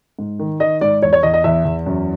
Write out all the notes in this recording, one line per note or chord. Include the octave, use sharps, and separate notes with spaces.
G#2
D#3
D#3 D#5
G#2 D5
E2 C#5
C#5
E2 D#5
D#5
E2 E5
E2
F#2